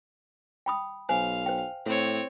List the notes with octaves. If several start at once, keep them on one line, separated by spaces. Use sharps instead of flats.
G5 B5 D#6
B1 C5 F5 G#5
C5 G5
A2 C4 C#5